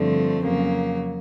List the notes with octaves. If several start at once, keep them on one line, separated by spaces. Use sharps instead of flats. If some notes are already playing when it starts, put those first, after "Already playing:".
Already playing: G2 D3 F3 A3 C4
F2 C#3 F#3 A#3